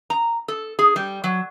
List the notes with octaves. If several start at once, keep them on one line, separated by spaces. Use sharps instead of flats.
A#5
A4
G#4
G3
F#3